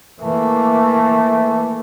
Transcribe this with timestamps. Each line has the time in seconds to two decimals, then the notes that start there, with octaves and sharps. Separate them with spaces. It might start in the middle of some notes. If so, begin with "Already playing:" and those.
0.22 E3 A3 A#3